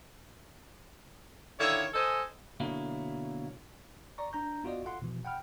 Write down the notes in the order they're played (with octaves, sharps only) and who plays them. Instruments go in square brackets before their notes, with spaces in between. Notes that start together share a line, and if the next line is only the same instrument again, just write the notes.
[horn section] D3 D#3 E4 F4 C#5
A4 C5 D#5 G#5
[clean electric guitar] B2 D3 F#3 A#3 E4
[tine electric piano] D5 A#5 C#6
D4 A#5 G6
B3 F4 F#4 D5 D#5
F4 A4 F#5 C6
B2 E3 F3
F#5 G5 B5 F6